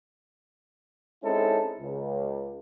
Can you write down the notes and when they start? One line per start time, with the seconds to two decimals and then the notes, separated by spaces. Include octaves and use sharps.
1.23 G#3 C4 C#4 D#4 E4 A4
1.80 C#2